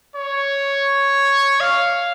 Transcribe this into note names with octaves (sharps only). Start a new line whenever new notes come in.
C#5
F5